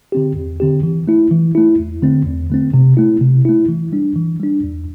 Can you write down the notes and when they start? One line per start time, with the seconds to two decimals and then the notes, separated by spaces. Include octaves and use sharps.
0.12 D3 C4 G4
0.36 E2
0.60 D3 C4 G4
0.83 E3
1.08 A3 E4
1.31 E3
1.55 A3 E4
1.79 E2
2.02 D3 A3 C4
2.26 E2
2.50 D3 A3 C4
2.74 C3
2.97 A3 E4
3.21 C3
3.45 A3 E4
3.68 E3
3.92 G3 D4
4.16 E3
4.40 G3 D4
4.64 E2